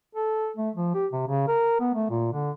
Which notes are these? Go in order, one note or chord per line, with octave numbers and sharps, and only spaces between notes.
A4
A3
F3
G4
C3
C#3
A#4
B3
A3
A#2
D3